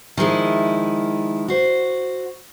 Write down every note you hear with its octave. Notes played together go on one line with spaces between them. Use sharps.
D#3 F3 G#3 E4
F#4 C5